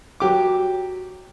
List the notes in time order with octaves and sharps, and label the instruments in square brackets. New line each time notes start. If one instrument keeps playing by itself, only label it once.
[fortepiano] F#3 G4 D6